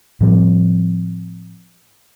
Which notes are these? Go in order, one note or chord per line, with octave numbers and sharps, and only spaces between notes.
A2 F3 G3 C4